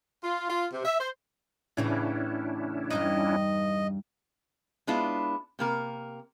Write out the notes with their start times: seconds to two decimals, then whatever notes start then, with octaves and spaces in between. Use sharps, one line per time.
0.24 F4
0.50 F4
0.73 C3
0.85 E5
1.00 C5
1.77 A2 C#3 E3 C#4 D4 E4
2.90 E2 G2 D#4 D#5
4.87 G#3 B3 D4 E4 F4
5.59 C3 A#3 A#4